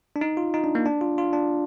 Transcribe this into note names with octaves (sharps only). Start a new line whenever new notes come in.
D4
D#4
F4
D#4
D4
A#3
D4
F4
F4
D4